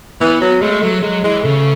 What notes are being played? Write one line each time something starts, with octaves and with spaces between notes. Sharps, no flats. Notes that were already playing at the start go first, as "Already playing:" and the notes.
E3 B3
F#3
G#3 A3
F#3 A3
F#3 G#3
E3 G#3
C#3 A3